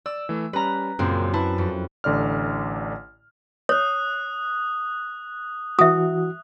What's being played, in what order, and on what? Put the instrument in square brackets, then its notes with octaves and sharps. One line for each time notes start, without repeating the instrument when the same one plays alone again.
[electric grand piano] D5 [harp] E6
[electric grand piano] E3 A3
[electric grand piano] G3 C#4 [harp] B4 A#5
[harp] F#2 C4 [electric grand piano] A#2 C#3
[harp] E4 [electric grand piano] B4 A5
[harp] F2
[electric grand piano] A1 D3 D5 F6
[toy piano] C#5 [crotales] D#6 F#6
[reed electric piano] E3 F#4 [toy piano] E5 D#6